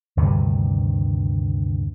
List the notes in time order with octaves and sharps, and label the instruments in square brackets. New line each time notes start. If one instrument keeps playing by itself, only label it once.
[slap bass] D2 G2 C3 D#3